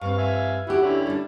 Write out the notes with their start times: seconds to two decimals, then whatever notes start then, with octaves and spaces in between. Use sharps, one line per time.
0.01 G2 C4 F5 C#6
0.18 E5 F5 G#5
0.67 D2 E4 F#4 G4 F#5
0.82 D3 C#4 E4
1.07 G3 D4